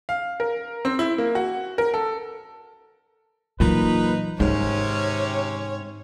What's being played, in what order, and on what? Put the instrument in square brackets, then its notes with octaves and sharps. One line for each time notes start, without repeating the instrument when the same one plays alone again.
[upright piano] F5
A#4
C4
E4
A#3
F#4
A#4
A4
[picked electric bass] A#2 [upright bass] E3 F#3 [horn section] D#4 B4
[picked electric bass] G#2 [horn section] C3 C#4 [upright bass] D#3 [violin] C#5